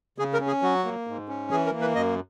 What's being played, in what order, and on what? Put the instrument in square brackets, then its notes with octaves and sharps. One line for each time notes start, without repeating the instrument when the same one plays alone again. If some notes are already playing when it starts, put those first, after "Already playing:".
[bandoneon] C#3 G#4
A#4
C#4
G#4
F#3 F#4
A#3
G#2
C#4
E3 G#4
A#4
A#3
B4
F#2 D#5